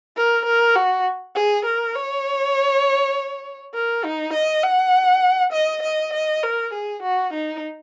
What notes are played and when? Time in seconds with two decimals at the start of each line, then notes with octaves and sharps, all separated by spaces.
0.16 A#4
0.46 A#4
0.76 F#4
1.35 G#4
1.65 A#4
1.95 C#5
3.74 A#4
4.04 D#4
4.33 D#5
4.64 F#5
5.53 D#5
5.83 D#5
6.13 D#5
6.43 A#4
6.73 G#4
7.03 F#4
7.33 D#4